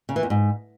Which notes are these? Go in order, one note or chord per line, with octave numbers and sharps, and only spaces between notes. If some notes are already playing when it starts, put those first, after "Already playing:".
C#3
E3
E2
G#2